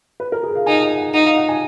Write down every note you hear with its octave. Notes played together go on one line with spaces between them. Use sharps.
B4
A#4
G#4
F5
D#4 G#5
G#5
F#5
D#4 F#5
F5
F#5
G#5